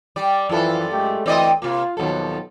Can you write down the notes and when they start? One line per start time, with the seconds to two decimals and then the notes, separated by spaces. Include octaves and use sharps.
0.16 G3 D5
0.49 F#2 E3 F3 F4 A4
0.90 G#3 A3 G4
1.26 D2 E3 C4 D5 D#5
1.62 C3 A#3 F4
1.97 D#2 B2 F3 F#3 A4